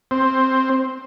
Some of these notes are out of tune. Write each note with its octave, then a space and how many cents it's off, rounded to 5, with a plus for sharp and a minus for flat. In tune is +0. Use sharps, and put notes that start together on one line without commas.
C4 +5